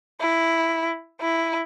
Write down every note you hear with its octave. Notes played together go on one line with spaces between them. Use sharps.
E4
E4